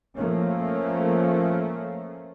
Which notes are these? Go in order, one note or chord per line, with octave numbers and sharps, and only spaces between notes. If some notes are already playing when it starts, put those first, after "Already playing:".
F3 A3 A#3 C#4